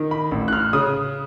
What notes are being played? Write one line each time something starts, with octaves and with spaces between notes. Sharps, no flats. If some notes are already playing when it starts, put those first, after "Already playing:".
Already playing: D#3
B5
A1
F#6
F6
C#3 D#6